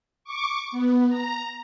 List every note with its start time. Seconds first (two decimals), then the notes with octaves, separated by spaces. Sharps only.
0.24 C#6 D6
0.72 B3
1.09 A#5